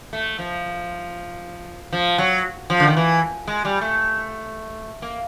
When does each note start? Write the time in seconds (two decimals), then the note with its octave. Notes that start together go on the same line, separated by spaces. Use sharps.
0.13 A3
0.39 F3
1.93 F3
2.18 F#3
2.70 F3
2.80 D3
2.88 D#3
2.97 E3
3.48 G#3
3.65 G3
3.81 A3
5.02 A#3